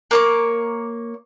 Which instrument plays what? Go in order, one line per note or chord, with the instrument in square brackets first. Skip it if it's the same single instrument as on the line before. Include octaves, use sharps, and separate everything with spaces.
[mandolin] A#3 C#5 D6